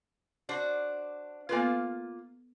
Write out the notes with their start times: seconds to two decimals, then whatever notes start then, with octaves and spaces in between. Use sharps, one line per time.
0.49 D4 F#4 C5
1.49 A#3 B3 F4 A4 B4